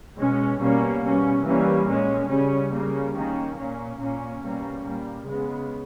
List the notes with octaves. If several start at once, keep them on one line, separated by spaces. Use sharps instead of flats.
B2 G#3 C#4
B2 G3 A#3 C#4
B2 G3 C#4
E3 G3 A#3 C#4
A#2 G#3 C#4
C#3 G3 C#4
C#3 G3 A#3 C#4
D#3 A#3 C#4
A#2 A#3 C#4
A#2 A#3 C#4
B2 G3 A#3 C#4
A#2 G3 A#3
C#3 G#3 B3